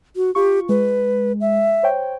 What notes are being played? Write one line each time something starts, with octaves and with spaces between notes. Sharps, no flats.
F#4
F4 G4 C#6
G#3 B4
E5
C5 C#5 G5